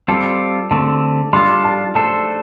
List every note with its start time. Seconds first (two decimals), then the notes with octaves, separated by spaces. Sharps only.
0.08 G3 C4 F4 A4 A5
0.71 D3 A3 C4 A5
1.33 G3 D4 F4 A4 C6
1.64 A5
1.95 A3 D4 A4 C5 A5